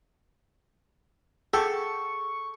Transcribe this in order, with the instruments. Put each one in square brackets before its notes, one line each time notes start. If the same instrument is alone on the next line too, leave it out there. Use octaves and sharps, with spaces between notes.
[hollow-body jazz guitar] G#4 F#5 G5 [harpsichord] A4 [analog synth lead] C#6